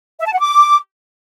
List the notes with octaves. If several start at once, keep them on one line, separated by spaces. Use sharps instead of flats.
E5
A5
F#5
D6